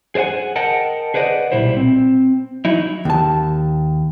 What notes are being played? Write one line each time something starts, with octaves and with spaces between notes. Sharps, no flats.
G#4 C5 D5 F#5 G#5
A#4 D#5 F#5 G5 A5
G#4 B4 C5 D5 D#5 F#5
B1 A#2 G3 E4 C5
C4
F#3 D#4 E4
D#2 A5